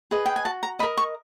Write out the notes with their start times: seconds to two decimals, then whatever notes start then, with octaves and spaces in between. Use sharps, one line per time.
0.11 G#4 B4 D#5
0.26 G5
0.36 G#5
0.45 F#4 A5
0.63 A#5
0.79 D#5 B5
0.83 A#4
0.97 C#6